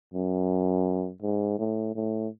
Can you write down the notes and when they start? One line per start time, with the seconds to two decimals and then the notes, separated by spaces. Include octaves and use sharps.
0.14 F#2
1.22 G#2
1.59 A2
1.95 A2